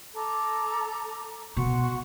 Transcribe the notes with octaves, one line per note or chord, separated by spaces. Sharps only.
A4 A#5 D6
B2 F#4 C6 C#6